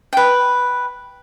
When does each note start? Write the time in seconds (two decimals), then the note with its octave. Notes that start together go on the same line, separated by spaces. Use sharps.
0.13 B4 G5